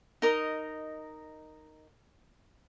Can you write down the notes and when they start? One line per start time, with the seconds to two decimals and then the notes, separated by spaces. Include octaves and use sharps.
0.22 D#4 A#4 D#5